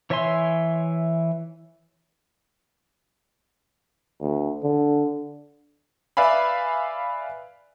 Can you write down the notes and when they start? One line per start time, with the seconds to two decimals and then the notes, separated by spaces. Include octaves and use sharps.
0.10 E3 C#5 E5 G#5 C6
4.21 D2
4.63 D3
6.17 B4 D5 E5 F5 G#5 B5